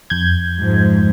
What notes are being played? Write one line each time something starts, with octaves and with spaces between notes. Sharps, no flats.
F2 G6 G#6
G#2 F3